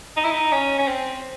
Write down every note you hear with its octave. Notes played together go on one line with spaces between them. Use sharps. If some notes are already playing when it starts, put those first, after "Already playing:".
D#4
E4
D#4
C#4
C#4
C4